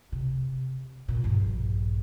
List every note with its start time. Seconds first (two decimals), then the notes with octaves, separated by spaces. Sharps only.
0.12 C3
1.08 C#2 A#2
1.24 A#1 G2